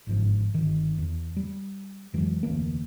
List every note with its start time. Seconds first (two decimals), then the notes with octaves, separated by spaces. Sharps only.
0.07 G1 G#2 F3
0.54 G1 D#3
0.98 E2
1.37 G3
2.13 F2 E3 F#3 G#3
2.43 F1 D2 E3 A#3